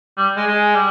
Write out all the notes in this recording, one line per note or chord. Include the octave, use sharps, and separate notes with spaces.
G3
G#3
G#3
G3